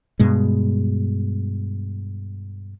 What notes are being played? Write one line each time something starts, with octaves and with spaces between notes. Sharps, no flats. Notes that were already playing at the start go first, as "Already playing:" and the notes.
G2 B2 G#3